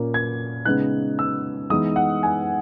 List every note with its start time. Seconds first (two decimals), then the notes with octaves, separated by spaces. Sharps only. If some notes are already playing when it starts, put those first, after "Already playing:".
Already playing: A#2 A#3 C#4
0.14 G#6
0.65 C#3 G#3 B3 D#4 F#6
1.19 E6
1.70 E3 G#3 B3 D#4 D#6
1.96 F#5
2.23 G#5